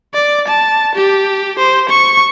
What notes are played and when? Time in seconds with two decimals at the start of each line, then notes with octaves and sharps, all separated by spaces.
0.14 D5
0.47 A5
0.95 G4
1.59 C5
1.89 C#6